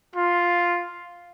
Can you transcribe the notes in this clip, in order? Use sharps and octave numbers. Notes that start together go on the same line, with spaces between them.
F4